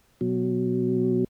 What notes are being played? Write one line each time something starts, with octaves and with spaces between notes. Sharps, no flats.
B2 F#3